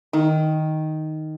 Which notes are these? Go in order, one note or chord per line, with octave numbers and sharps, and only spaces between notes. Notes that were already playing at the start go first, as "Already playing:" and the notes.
D#3